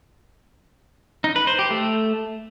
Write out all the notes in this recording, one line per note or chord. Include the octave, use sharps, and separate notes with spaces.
D#4
B4
C5
G4
A3